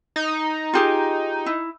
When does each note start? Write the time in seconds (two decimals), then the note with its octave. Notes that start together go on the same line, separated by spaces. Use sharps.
0.16 D#4
0.73 F4 G4 G#4
1.46 E4